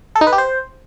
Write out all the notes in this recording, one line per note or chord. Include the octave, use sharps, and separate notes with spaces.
A4
D#4
B4
G4
C5